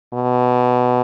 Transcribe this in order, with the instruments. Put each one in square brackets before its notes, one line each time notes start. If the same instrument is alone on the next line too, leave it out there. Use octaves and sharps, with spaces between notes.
[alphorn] B2